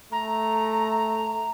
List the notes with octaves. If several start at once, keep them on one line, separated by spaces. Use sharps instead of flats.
A3 A#5